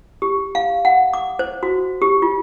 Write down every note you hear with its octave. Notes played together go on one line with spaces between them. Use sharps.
G4
F5
F#5
D6
C5
F#4
G4
F4